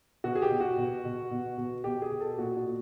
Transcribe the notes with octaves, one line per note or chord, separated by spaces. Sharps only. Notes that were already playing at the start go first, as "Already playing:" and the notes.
B2 F#4
G#4
G4
B2
F#4
B2
B2
B2
B2
B2 G4
G#4
B2
A4
A#2 F#4
F#4
A#2